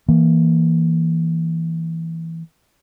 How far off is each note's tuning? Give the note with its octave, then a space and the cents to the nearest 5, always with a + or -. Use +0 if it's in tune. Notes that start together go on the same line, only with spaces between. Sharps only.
E3 -5 A#3 +0